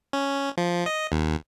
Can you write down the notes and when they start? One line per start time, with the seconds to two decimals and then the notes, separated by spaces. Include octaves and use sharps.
0.13 C#4
0.57 F3
0.86 D#5
1.12 D#2